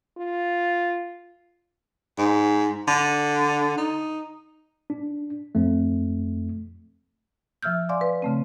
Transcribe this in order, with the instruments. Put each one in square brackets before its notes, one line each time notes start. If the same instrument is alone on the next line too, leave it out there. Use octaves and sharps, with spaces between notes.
[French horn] F4
[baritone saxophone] G#2
D3
D#4
[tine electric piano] D4
F2 A3
[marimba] F3 E5 E6 F6 G6
D5 F5 G#5 C6 D6
B4
C#3 A3 C4